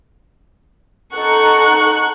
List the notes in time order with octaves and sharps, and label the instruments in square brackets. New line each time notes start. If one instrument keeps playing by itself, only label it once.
[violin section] D#4 A4 [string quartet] F#5 C#6 F#6